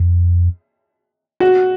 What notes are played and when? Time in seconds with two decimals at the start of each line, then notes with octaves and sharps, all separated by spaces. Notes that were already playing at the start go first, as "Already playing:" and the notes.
Already playing: F2
1.40 F#4